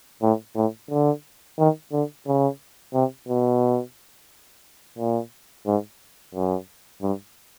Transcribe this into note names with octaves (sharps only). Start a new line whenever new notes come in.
A2
A2
D3
D#3
D3
C#3
C3
B2
A#2
G#2
F#2
G2